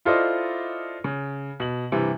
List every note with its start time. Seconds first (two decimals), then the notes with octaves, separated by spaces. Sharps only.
0.05 E4 F4 A4 C5 D5 D#5
1.04 C#3
1.60 B2 F#7
1.92 G2 C3 E3